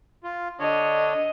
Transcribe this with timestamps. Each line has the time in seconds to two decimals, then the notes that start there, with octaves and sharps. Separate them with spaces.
0.24 F4
0.60 D3 D4 C#5 D#5